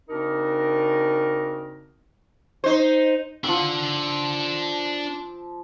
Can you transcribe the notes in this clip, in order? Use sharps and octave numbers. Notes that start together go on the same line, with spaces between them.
C#3 C4 D4 D#4 F#4 A#4
D#4 C5
F3 D4 F#5 E6